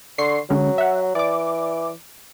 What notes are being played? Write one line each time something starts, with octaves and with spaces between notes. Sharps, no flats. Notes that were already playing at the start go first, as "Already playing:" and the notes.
D3 C6 C#6 C7
D3 F#3 G#3 C#4
E5 F#5
E3 D5 D6